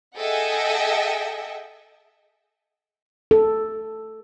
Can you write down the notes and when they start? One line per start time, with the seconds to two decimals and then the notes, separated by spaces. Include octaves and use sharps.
0.17 G#4 A4 D#5 E5 F#5 G5
3.31 A4